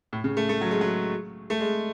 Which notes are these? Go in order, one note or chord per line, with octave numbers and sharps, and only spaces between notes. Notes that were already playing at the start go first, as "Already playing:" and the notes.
A2
C#3
A3
A3
F#3
G#3
F#3
A3
G#3